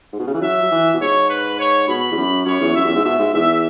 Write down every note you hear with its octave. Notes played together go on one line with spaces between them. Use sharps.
G#2
B2
C#3
E3
F#3 E5
F#3
E3
B2
G#2 C#5
B4
C#5
B2 B5
E2
F#2
F#2 C#5
E2
F#2 E5
E2
G#2
B2 E5
G#2
E2 E5